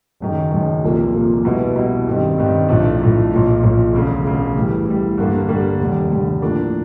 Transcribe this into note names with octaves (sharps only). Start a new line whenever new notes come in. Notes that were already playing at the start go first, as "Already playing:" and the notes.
F#1 F#2 D#3
F#1 F#2 D#3
C2 A#2 F3 A#3
C2 A#2 F3 A#3
B2 G3 B3 E4
B2 G3 B3 E4
G2 D#3 G3 C4
G2 D#3 G3 C4
B1 A2 F3 A3 D4
B1 A2 F3 A3 D4
B1 A#2 F3
B1 A#2 F3
E1 D2 C#3
E1 D2 C#3
A2 E3 G3
A2 E3 G3
G2 D3 G3 A#3 D4
G2 D3 G3 A#3 D4
F1 D#2 D3 G3
F1 D#2 D3 G3
A2 F3 A#3 D4